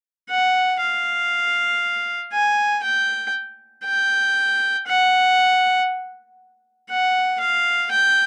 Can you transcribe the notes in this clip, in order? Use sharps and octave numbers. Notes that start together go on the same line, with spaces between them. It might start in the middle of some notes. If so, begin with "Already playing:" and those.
F#5
F5
G#5
G5
G5
F#5
F#5
F5
G5